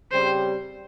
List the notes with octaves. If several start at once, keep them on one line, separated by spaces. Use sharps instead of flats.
C#3 G3 C4 G4 C5